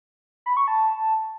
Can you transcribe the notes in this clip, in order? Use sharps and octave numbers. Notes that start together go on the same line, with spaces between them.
B5
C#6
A5